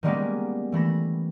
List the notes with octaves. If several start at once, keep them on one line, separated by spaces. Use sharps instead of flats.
D#3 G3 G#3 A#3 B3 C#4
E3 A3 B5 A#6